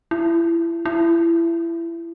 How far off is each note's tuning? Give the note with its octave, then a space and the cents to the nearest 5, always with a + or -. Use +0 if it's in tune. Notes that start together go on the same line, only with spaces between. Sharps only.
E4 +25
E4 +25